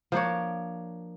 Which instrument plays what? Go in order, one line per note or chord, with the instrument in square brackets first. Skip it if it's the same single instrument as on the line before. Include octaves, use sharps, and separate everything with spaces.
[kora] F3 A#3 D4 C#5